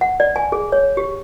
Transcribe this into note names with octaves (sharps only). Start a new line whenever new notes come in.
F#5
D5
G#5
G#4
C#5
G4